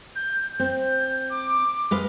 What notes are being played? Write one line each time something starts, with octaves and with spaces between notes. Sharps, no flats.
G6
C4 G6
D6
G#3 B4 F5